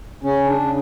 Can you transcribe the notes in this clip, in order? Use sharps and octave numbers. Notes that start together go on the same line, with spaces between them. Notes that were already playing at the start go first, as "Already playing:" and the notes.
C#3 C#4
D4
C#3